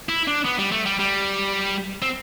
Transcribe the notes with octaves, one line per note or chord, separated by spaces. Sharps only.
E4
D4
B3
G3
A3
G3
G3
C4